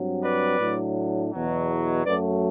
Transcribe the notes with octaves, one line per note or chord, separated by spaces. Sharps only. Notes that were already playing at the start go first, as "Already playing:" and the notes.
Already playing: G2 F#3 C4
B4 D5
A2 F#3 A3 D4
E2 B2 F#3
F#2 F#3 A3 B4 D5